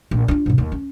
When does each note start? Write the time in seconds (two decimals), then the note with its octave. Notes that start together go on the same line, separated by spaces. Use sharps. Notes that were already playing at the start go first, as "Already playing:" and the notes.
0.11 A#1
0.28 D4 F4
0.46 G#2 C3
0.58 D#2
0.72 C#4